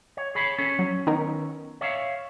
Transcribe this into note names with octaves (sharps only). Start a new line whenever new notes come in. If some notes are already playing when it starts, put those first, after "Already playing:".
C#5
G#4 C#5 B5
C#4 A4
F#3
D#3 B3 A#4
C#5 E5 F5